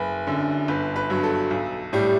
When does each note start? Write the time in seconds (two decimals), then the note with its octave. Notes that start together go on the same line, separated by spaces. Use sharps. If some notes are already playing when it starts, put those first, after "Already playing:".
Already playing: F#1 B4
0.27 F#2 D3
0.68 G1 B4
0.96 B4
1.10 G2 F#3
1.23 A4
1.51 B1
1.93 A2 G3